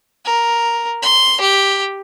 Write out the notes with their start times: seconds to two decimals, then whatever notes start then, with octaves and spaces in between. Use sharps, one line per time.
0.25 A#4
1.02 C6
1.41 G4